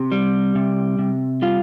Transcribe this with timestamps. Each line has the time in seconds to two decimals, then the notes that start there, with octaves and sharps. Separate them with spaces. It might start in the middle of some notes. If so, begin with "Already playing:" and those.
Already playing: C3
0.12 G3
0.55 C3
0.99 C3
1.42 G3 F4